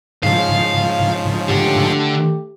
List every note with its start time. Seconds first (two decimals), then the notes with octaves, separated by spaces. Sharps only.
0.23 G#2 C#3 F3 F5
1.49 D3 A3 G4 F#5